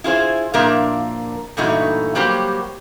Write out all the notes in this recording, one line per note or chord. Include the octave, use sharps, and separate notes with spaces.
E4 F4 G#4 C5
A#2 F3 A#3 D4 A#4 E5
G2 A#2 E3 A3 D#4 F#4
F#3 G3 A#3 F#4 G4 C5